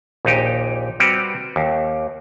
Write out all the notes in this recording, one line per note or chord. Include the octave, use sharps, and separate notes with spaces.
A#1 D#2 A#2 D#4 G4
G3 C4 F#4 G4 B4
D#2